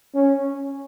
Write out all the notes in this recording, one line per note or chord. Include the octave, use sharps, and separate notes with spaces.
C#4